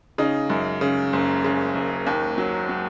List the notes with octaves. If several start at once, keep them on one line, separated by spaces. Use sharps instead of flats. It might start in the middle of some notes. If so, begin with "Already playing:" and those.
C#3 D#4
F#2
C#3
F#1
C#3
F#1
D#2
F#3
F#3